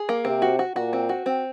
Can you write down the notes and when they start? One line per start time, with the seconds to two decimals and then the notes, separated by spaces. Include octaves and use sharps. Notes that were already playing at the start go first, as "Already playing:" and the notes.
Already playing: G#4
0.09 A#3
0.25 C3 C4
0.42 F#4
0.59 F#4
0.76 A#2 F#4
0.93 C4
1.09 F#4
1.26 C4